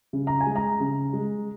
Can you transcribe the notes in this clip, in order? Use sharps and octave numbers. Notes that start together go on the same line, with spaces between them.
C#3
A#5
G#5
G#3
A#5
C#3
G#3